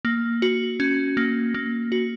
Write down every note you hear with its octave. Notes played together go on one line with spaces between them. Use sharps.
A#3
F#4
C#4
A#3
A#3
F#4